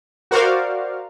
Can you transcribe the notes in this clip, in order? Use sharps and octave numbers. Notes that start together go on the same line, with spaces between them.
F#4 A#4 C5 D5 F5